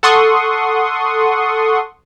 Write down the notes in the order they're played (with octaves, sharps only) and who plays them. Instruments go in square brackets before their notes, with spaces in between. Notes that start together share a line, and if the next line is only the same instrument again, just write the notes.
[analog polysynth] A4 F#5 C6 C#6 D#6